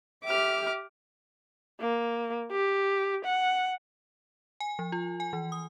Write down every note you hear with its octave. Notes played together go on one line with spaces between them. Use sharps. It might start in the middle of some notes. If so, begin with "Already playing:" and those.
G4 E5 D6 F6
A#3
G4
F#5
G#5
F3
F4
G#5
E3
D#6